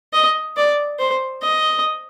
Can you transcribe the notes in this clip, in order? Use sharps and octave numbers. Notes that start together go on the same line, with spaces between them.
D#5
D5
C5
D#5